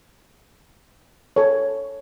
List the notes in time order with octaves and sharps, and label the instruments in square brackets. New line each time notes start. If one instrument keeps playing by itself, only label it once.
[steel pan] A4 C#5